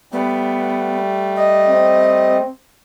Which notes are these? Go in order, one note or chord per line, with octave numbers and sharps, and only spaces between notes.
G3 A3 B3
D#5
C4